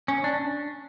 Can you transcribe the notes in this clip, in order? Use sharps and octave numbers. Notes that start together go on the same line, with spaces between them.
C#4
D4